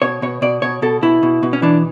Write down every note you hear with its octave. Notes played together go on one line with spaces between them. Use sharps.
B2 C#5
B2 C#5
B2 D5
B2 C#5
B2 A4
B2 E4
B2
B2
C#4
E3 D4